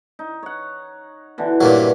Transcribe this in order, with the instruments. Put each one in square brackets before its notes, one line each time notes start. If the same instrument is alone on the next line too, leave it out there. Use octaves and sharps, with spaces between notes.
[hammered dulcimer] D#4
C#5 F#5
B2 D3 E3
[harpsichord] G2 A#2 F#3